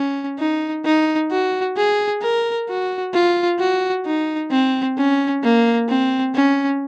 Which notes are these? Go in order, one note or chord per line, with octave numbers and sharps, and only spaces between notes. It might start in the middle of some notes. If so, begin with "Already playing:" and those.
Already playing: C#4
D#4
D#4
F#4
G#4
A#4
F#4
F4
F#4
D#4
C4
C#4
A#3
C4
C#4